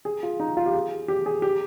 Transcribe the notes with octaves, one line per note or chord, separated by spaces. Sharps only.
G#4
F4
D#4
F4
G4
G#4
G4
G#4
G4